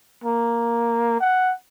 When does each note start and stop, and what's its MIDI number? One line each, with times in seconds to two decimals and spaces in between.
0.24 1.16 58
1.21 1.52 78